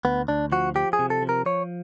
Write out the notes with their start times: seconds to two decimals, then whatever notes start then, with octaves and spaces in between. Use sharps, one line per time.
0.05 D2 B3
0.28 D2 D4
0.52 F3 F#4
0.75 F3 G4
0.93 G#4
0.99 C3
1.10 A4
1.22 F3
1.29 A#4
1.46 F3 C#5